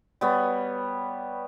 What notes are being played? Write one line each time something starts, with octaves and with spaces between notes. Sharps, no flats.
G3 B3 C#5